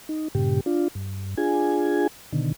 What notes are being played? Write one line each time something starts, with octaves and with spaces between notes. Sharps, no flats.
D#4
G2 A#2 C#3 G4
D4 F4
G2
D4 F4 G#4 G#5
B2 D3 D#3